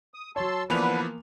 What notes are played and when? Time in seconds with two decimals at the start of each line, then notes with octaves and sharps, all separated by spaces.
0.14 D#6
0.36 F#3 C#5 A5 C6 E6
0.70 D3 E3 F3 A#3 B3 B4 F7